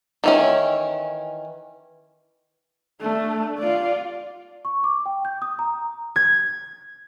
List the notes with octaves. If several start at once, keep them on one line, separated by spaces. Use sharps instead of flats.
D#3 E3 C#4
A3 D4
F4 D5
C#6
D6
G5
G6
D#6
A#5
G#6